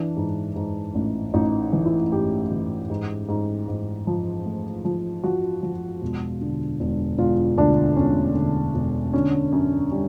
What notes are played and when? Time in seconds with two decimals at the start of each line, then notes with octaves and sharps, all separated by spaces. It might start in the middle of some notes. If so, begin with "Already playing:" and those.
Already playing: E3 D4
0.17 G#2
0.56 G#2
0.95 A1
1.34 A1 D#4
1.73 E3
1.86 E4
2.12 G#2 G4
2.51 E3
2.90 G#2
3.29 G#2
3.68 G#2
4.07 F3
4.45 A3
4.85 F3
5.24 F3 F#4
5.63 F3
6.02 E1
6.41 D3
6.80 E1
7.19 E1 F4
7.58 D2 D4
7.97 E1 C#4
8.35 D3
8.75 E1
9.13 D3 C#4
9.52 F#2
9.92 G3